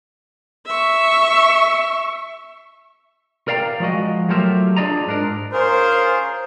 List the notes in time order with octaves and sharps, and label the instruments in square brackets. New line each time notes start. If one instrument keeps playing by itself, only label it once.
[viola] E5 C#6
[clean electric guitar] A#4 D5 F5 G5 A#5
F3 G#3 F#4 D#5
F#3 A3 F4 G4 A#4 E5
D4 F4 G#4 D5 D#5 A#5
G#2 D4 A#4
[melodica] C#4 F4 G#4 [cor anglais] A#4 [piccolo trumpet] C5